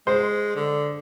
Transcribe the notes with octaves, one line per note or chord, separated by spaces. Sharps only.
G#3 C5
D3